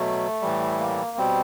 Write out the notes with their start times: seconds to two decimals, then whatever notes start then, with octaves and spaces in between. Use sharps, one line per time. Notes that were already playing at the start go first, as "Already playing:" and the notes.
Already playing: B2 F#3 A3
0.41 A2 E3 G3
0.79 A#3
1.18 B2 G3 C4